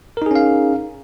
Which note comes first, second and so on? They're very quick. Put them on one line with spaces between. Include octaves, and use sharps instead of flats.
A#4 D#4 G#4 C#4 F5